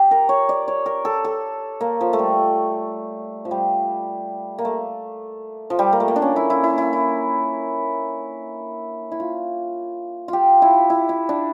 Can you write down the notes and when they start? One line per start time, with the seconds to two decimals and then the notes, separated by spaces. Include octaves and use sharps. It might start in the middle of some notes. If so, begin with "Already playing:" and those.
Already playing: G4
0.11 A#4
0.29 C#5
0.49 D5
0.68 C#5
0.86 A#4
1.05 A4
1.24 A4
1.81 A#3
2.01 F3
2.13 A3
2.19 G3
3.45 F3
3.51 G3
4.58 A#3
4.65 A3
5.70 F3
5.79 G3
5.93 A#3
6.00 A3
6.08 A#3
6.16 D4
6.22 C#4
6.36 E4
6.50 E4
6.64 E4
6.78 E4
6.93 E4
9.12 E4
9.20 F4
10.28 F4 G4
10.62 E4
10.90 E4
11.09 E4
11.29 D4